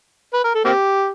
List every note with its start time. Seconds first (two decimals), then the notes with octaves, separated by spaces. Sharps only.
0.33 B4
0.44 A#4
0.54 A4
0.64 A#3 C4 G4